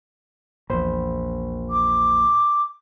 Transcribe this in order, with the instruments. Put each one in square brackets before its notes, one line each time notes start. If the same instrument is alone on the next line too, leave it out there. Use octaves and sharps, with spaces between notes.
[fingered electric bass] A#1 [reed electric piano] E2 C5 B5
[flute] D6